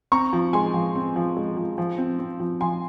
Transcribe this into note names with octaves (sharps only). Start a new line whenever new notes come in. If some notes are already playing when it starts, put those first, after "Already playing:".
C4 A#5 C#6
F3
G#3 G#5 C6
F3
C4
F3
G#3
F3
F3
C4
C4
F3
F3 G#5 C6